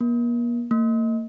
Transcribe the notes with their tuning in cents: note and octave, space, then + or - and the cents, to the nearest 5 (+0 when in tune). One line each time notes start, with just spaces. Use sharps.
A#3 +40
A#3 -40